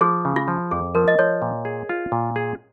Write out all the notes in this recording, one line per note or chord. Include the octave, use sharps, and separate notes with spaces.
F3 G#4
C#3
F4
F3
F2 G#4
F3 A#4
D#5
F3 C#5
A#2
G#4
F4
A#2
G#4